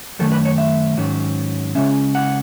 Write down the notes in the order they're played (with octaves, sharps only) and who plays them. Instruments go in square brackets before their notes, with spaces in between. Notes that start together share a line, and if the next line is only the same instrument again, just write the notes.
[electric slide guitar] F#2 D#3 A3 A4
B4
C#5
E5
G#2 D#3 F#3 C#4
C#3 G#3 C#4 E5
F#5